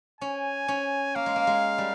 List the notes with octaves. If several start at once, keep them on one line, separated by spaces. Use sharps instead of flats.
C#4 G#5
C#4
A#3 F5
G#3
A#3
G#3
G3